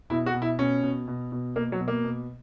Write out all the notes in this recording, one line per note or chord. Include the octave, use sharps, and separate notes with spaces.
B2 E4
F#4
B2
E4
B2 C#4
B2
B2
B2
B2 A#3
F#3
B2
A#3
B2